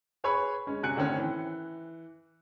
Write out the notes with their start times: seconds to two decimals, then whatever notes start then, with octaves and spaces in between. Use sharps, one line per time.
0.24 G#4 B4 C#5 B5 C#6
0.67 G#3 C#4
0.83 C3 F#4 G#5 F#6 C#7
0.96 A2 D3 D#3 C4 C#4
1.18 E3